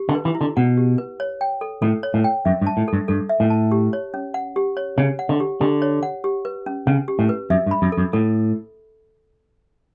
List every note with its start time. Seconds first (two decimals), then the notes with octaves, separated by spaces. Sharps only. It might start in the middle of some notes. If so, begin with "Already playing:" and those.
Already playing: G4
0.09 D3
0.15 B4
0.25 E3
0.35 E4
0.41 D3
0.57 B2 F#5
0.77 G4
0.98 B4
1.20 C#5
1.41 G5
1.61 A4
1.82 A2 A4
2.03 C#5
2.14 A2
2.24 G5
2.45 F#2 E5
2.62 G2
2.67 A5
2.77 A2
2.88 G2 A4
3.08 G2 A4
3.29 E5
3.40 A2
3.50 A5
3.71 G4
3.93 C#5
4.14 C#4
4.34 F#5
4.56 G4
4.77 C#5
4.98 C#3 C#5
5.19 F#5
5.29 D3
5.40 G4
5.61 D3 G4
5.82 C#5
6.03 F#5
6.24 G4
6.45 B4
6.66 C#4
6.87 C#3 C#4
7.08 G4
7.19 A2
7.29 B4
7.50 F#2 E5
7.66 G2
7.71 B5
7.82 F#2
7.92 A4
7.97 F#2
8.13 A2 A4